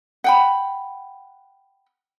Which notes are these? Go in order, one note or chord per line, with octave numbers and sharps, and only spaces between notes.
F#5 G5 B5